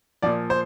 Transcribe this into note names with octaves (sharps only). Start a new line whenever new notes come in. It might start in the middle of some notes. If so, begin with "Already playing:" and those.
A#2 F3 D5
C5